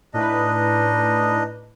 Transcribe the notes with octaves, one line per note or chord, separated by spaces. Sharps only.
A2 D4 D#4 B4 D#5